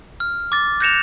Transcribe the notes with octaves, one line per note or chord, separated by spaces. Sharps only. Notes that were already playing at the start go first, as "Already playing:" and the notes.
F6
D6 A6
F#6 G6 A#6 C#7 E7 F7